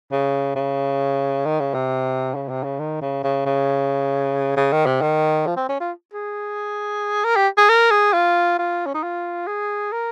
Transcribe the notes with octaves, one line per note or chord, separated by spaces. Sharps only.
C#3
C#3
D#3
C#3
C3
C#3
C3
C#3
D#3
C#3
C#3
C#3
C#3
D#3
C3
D#3
F3
C4
C#4
F4
G#4
A#4
G4
G#4
A#4
G#4
F4
F4
C#4
D#4
F4
G#4
A#4